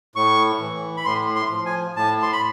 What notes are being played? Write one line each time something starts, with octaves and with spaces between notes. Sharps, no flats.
A2 C#6
E3
B5
A2 C6
C6
F3
G#5
A2 A5
C6
B5